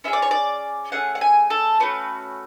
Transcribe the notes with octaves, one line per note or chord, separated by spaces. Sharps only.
C#4 E4 G#4 E5
D5
C#5
D5
A3 C#4 G#4 F#5
F#5
G#5
A4
A3 C#4 F#4 B4